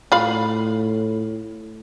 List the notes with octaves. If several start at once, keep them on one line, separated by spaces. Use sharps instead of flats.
A2 F4 F5 B5